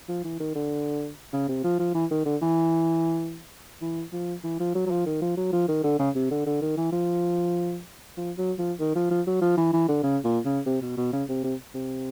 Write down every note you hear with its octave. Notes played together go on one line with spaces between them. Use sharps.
F3
E3
D#3
D3
C#3
C3
F3
F3
E3
D#3
D3
E3
E3
F3
E3
F3
F#3
F#3
F3
D#3
F3
F#3
F3
D#3
D3
C#3
C3
D3
D3
D#3
E3
F3
F3
F#3
F3
D#3
F3
F3
F#3
F3
E3
E3
D3
C#3
A#2
C#3
C3
B2
B2
C#3
C3
C3
C3